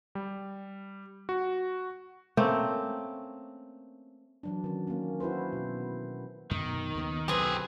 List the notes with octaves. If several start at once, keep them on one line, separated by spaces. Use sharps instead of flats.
G3
F#4
A3 A#3 C4 C#4
E3 F#3 D4
D#3 C#4
A#3 C#4
E4 F#4 B4 C5
B2
F#2 B2 D#3
D#2 C#3 B3
B1 D3 F#3 C4 G4 G#4 B4